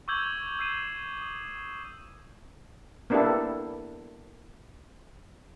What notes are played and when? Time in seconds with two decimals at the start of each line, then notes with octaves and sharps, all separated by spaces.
0.08 C#6 D6 E6 G6 G#6 F#7
0.59 E6 G6 C7 D#7 E7
1.21 D#6
3.10 A#3 B3 D4 E4 G4 A4